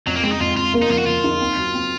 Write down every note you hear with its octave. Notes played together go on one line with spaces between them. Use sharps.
F2 F#3
A#3
G#3 C4
D#4
F2 F4
F2 F4
A#3
D#4
F3 F4
F#4
F3 F4
D#4
C4
F#3
C4